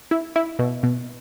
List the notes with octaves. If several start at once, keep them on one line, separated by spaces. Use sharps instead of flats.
E4
E4
B2
B2